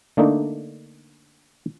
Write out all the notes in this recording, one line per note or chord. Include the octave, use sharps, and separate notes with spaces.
D3 A3 A#3 D4 D#4